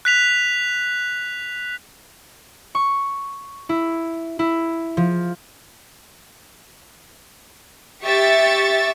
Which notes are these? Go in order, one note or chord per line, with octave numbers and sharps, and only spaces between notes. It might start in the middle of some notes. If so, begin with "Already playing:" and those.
F#6 B6 F7
C#6
E4
E4
F3
G4 E5 C#6 A6